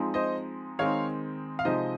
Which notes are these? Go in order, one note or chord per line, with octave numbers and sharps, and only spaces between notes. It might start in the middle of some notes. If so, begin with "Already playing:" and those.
Already playing: F3 G#3 C4 D#4
C5 D#5
D#3 G#3 C4 D#4 C#5 F5
F5
C3 F3 G#3 D#4 C5 D#5